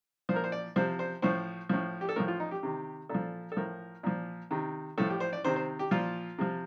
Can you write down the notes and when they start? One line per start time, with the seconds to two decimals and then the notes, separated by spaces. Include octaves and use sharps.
0.29 F3 C5
0.33 A#2 A#4
0.44 C5
0.52 D5
0.76 C3 F3 C5
0.99 C5
1.22 A2 F3 C5
1.69 A2 F3
2.01 G4
2.09 A4
2.16 A2 F3 A#4
2.28 F4
2.40 D#4
2.51 G4
2.63 C3 D#3
3.09 A#2 F3 A4
3.52 A4
3.56 A2 F3 A#4
4.03 A#2 F3
4.51 C3 D#3
4.98 A2 F3 A4
5.10 G4
5.20 C5
5.33 D5
5.44 C3 D#3 C5
5.56 C5
5.79 G4
5.91 A#2 F3 F4
6.38 C3 F3